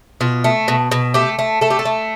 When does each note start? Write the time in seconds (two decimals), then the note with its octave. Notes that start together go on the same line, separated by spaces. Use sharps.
0.21 B2 F4
0.44 A3
0.68 B2
0.92 B2
1.14 A3 G4
1.39 A3
1.61 A3 A4
1.70 G4
1.79 A4
1.85 A3